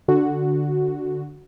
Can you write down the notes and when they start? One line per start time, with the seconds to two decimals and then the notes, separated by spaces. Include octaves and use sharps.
0.08 D3 F#4